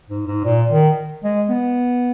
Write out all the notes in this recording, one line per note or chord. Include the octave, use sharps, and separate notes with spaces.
G#2
G#2
A#2
D#3
G#3
B3